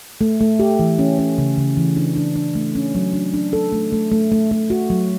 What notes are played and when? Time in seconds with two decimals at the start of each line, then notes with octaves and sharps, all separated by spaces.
0.21 A3
0.41 A3
0.60 G4
0.79 E3
0.99 C#4
1.19 C#4
1.38 C#3
1.58 C#3
1.77 E3
1.97 D4
2.16 D4
2.36 D4
2.55 A3
2.75 C#4
2.95 F#3
3.13 D4
3.34 D4
3.53 A4
3.73 A3
3.92 A3
4.12 A3
4.32 A3
4.51 A3
4.70 F#4
4.90 F#3